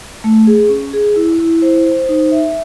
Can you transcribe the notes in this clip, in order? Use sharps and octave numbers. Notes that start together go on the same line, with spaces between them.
A3
G#4
C#4
G#4
E4
E4
C5
C5
D#4
E5